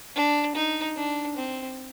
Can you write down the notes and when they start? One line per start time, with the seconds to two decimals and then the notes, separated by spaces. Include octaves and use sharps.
0.16 D4
0.55 D#4
0.97 D4
1.37 C4